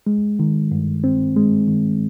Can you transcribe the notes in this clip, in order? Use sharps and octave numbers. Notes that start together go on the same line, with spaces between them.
G#3
D#3
G2
C4
G#3
D#3